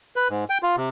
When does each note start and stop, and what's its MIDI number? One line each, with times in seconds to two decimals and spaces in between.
0.16 0.28 71
0.30 0.44 44
0.50 0.58 79
0.63 0.76 65
0.77 0.89 48